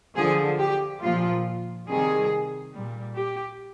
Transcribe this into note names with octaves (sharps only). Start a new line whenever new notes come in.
D3 F3 G#4
G4
A#2 F3 F4
C3 D#3 G3 G#4
A#2 G3
G4